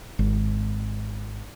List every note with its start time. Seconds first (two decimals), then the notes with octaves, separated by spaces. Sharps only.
0.19 G#1